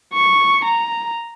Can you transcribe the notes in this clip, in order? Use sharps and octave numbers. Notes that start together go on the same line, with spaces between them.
C#6
A#5